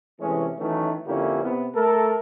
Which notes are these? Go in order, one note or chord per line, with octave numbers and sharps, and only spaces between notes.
C3 E3 G#3 A3 C#4
D#3 E3 F#3 A3 C#4
F2 D3 A#3 C#4 E4 G4
C3 B3
A3 A4 A#4